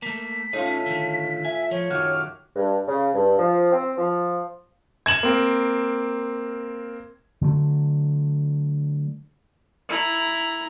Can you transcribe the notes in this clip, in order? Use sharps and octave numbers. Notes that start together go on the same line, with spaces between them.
A3 A#3 B6
A2 C#4 D#4 F4
D3 D#3
E5 G#5
F3 C#5
F#2 D#3 F#4 G4 F6
G2
C#3
G2
F3
C4
F3
G#6 E7 F#7
A#3 C4
D3 F#3 A3
E4 A#5